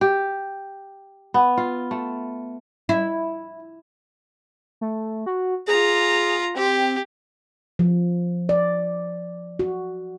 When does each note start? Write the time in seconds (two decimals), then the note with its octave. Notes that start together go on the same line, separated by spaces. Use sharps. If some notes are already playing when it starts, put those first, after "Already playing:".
0.01 G4
1.34 B3
1.57 F4
1.91 A3
2.89 E4
4.81 A3
5.26 F#4
5.68 F4 G#4 A#5
6.56 C4 G4
7.79 F3
8.49 D5
9.59 F#4